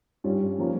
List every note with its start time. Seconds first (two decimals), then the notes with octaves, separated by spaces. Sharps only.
0.24 G2 G3 C#4 F4
0.58 F3 A#3 C#4 F4